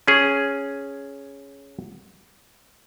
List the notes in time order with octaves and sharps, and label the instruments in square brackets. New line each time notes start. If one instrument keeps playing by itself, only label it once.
[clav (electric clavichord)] C#4 G#4